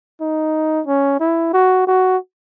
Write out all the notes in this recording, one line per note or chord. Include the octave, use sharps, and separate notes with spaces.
D#4
C#4
E4
F#4
F#4